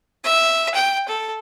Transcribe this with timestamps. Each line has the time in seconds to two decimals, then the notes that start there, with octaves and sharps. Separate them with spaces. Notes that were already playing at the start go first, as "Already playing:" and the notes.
0.24 E5
0.74 G5
1.08 A4